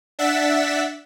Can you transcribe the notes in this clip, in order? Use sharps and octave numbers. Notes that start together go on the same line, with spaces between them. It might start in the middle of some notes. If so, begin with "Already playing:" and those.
D4 E5 F#5 A6 B6 E7